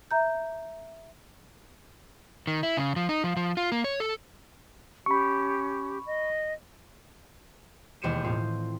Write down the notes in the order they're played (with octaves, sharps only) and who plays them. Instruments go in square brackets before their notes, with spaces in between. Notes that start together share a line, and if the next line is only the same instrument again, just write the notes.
[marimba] E5 A#5 G6
[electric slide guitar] D#3
E4
C#3
F3
D#4
F3
F3
F4
A#3
C#5
A4
[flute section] C#4 G4 [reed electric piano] B5 C#6
[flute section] D#5
[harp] E1 D#2 C5 C#7 D#7 E7
A2 C4 F4